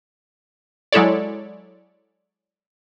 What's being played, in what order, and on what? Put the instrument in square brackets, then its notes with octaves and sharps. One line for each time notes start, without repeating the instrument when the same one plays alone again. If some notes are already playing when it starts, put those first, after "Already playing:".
[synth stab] F#3 G#3 E4 A4 C#5 D5